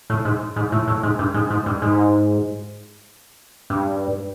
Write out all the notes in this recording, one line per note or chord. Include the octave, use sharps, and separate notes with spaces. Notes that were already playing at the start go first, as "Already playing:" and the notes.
A2
G#2
G#2
A2
A2
G#2
G2
G#2
G#2
G2
G#2
G2